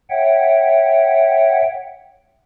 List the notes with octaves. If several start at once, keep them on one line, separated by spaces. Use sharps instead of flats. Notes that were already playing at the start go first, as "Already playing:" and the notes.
C#5 E5 F#5 G5